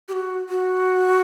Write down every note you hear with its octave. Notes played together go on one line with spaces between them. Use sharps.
G4
F#4
F#4